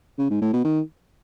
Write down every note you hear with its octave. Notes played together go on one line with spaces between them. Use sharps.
C#3
G#2
A2
B2
D#3